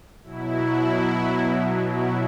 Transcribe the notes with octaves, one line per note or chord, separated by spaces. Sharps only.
B2 F#3 E4
E4